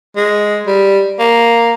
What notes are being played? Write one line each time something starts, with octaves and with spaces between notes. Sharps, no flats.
G#3
G3
A#3